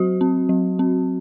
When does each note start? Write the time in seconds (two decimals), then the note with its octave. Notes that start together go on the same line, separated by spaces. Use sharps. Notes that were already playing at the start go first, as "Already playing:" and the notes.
Already playing: F#3 F#4
0.21 C4
0.49 F#3
0.79 C4